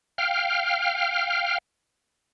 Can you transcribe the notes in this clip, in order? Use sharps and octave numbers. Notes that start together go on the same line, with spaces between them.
F5 G5 F6